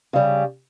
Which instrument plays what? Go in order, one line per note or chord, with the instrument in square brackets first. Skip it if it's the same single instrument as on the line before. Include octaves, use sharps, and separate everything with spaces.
[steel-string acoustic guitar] C#3 G3